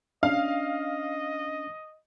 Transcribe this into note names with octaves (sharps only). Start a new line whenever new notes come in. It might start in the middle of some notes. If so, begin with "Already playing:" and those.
C#4 D4 D#5 F5